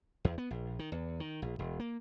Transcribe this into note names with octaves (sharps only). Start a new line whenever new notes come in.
E2
B3
A#1
D#3
E2
D#3
A#1
E1
A#3